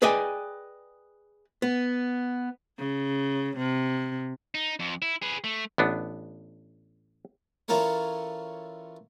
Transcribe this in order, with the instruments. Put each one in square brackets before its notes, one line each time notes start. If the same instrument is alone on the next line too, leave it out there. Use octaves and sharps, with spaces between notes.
[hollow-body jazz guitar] G#4 B4 D5 D#5 G5 G#5
B3
[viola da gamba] C#3
C3
[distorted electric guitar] D#4
F2
E4
G#4 B4
A3
[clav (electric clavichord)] A1 B3 D4
[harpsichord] E3 C#4 F4 A4 A#4 C#5